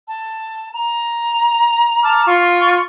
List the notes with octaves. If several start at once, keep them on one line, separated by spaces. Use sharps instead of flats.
A5
A#5
A5 A#5 D6 F6
F4 C6 C#6